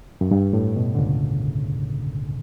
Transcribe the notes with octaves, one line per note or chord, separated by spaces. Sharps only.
F#2
G2
A2
B2
D3
C#2 C#3